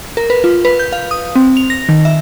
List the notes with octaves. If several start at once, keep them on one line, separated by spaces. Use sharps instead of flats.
A#4
B4
F4
B4
G6
F5
D#6
C4
F7
A#6
D#3
E5